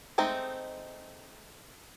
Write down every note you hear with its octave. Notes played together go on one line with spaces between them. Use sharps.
G#3 A3 C4 D#4